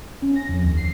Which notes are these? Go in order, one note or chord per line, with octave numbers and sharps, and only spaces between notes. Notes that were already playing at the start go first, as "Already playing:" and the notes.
C#4
A#6
F2
D#2
C7